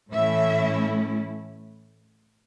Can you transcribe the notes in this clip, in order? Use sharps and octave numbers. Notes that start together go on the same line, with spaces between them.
A2 E3 A3 C#4 E4 E5